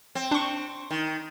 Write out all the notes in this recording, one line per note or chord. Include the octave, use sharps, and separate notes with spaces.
C4
D4 C#6
D#3